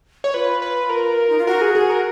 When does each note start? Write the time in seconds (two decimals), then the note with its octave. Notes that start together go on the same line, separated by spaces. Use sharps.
0.24 C#5
0.33 F4 B4
0.62 B4
0.90 A#4
1.29 D#4
1.38 F4
1.46 F#4 A#4
1.61 G#4
1.75 G#4
1.90 A#4